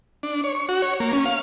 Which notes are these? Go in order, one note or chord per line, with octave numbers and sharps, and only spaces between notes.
D4
C#5
C#6
F#4
C#5
A#3
C#4
F5